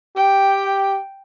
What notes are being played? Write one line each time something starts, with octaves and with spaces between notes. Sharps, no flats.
G4 G5